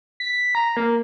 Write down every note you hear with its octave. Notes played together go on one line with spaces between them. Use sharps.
B6
A#5
A#3